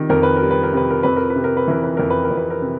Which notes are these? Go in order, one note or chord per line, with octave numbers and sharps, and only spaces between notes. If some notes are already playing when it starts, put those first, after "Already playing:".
Already playing: C3 D#3 G3
F2 A#4
B4
A#4
G3
B4
A#4
C3 B4
A#4
F2 B4
A#4
B4
C3
A#4
B4
E3 A#4
B4
F2 A#4
B4
A#4
F2
B4
A#4
C3